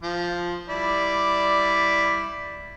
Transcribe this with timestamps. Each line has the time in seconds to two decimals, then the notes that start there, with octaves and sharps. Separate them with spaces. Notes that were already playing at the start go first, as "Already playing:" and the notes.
0.03 F3
0.69 G3 E4 D5